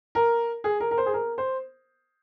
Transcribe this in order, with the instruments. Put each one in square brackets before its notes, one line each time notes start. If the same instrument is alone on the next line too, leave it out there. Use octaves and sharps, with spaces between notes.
[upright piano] A#4
G#4
A#4
A#4
C5
G#4
A#4
C5